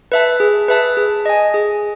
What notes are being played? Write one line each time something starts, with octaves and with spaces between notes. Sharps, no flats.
B4 E5 A5
G#4
B4 E5 A5
G#4
D#5 G#5
G#4